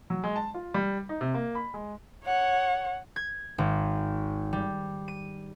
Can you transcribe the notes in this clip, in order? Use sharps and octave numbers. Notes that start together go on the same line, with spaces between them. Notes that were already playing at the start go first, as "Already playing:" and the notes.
F#3
G#3
A5
F4
G3
D#4
C3
A#3
B5
G#3
C#5 F#5
G#6
G#1
G3
D#7